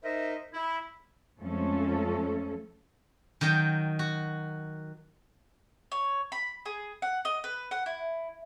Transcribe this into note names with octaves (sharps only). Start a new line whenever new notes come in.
D#4 A#4 C5 D#5 E5
E4
F2 F3 G#3 A3 C#4 A4
D#3 F#3 D#5 G5
F#4
C#5
B5
G#4
F#5
D#5
B4
F#5
E4